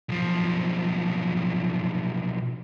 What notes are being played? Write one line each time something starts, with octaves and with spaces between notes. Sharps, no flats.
B1 F3